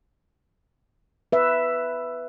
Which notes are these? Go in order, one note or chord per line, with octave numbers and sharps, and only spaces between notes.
B4 E5